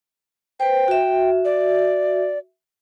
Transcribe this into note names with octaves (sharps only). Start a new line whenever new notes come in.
B4 C5 G5
F#4 E5
D5